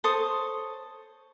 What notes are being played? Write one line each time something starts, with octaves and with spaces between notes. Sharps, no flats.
A4 C5 C#5 D#6